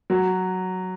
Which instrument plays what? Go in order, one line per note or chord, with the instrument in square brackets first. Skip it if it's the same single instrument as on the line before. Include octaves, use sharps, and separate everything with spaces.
[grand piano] F#3